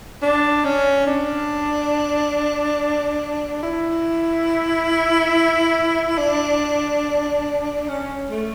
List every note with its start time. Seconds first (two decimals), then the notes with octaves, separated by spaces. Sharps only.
0.22 D4
0.65 C#4
1.07 D4
3.63 E4
6.18 D4
7.88 C#4
8.30 A3